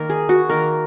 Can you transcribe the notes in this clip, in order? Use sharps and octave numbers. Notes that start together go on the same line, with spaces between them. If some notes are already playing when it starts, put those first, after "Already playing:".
Already playing: D#3 A#3 A#4
G#4
F#4
D#3 A#3 A#4